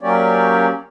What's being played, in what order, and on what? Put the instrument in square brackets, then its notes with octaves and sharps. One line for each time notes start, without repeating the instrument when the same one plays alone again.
[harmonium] F#3 A#3 C#4 G4 C#5 D5